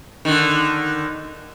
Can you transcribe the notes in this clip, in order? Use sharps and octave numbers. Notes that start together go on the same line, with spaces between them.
D3 D#3